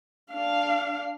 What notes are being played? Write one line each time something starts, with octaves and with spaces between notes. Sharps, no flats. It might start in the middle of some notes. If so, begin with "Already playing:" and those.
D4 F5